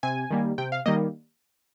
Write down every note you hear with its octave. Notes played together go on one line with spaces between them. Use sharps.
C3 G#5
D#3 G3 A#3
C3 G5
F5
D#3 G3 A#3 D#5